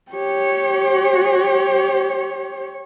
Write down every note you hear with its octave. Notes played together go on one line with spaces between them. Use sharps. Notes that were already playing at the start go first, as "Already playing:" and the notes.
G4 C#5